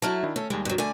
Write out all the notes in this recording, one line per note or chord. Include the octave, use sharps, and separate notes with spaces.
F#3 A3 E4 A5 F6
D#3 D4 E4
A3 C#4 A4
D#2 G3 G#3
G2 F#3
D3 A3 D5 G#5